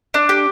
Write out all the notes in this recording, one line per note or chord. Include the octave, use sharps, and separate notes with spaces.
D4
G4